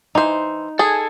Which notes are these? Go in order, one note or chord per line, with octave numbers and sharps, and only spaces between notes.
E3 D#4 C5
G#4 A4 G#5